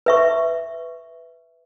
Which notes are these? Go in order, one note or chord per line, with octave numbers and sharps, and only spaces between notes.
B4 E5 C#6